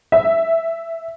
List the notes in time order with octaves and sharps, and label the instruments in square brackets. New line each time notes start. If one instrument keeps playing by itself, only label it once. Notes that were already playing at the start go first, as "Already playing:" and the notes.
[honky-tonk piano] E5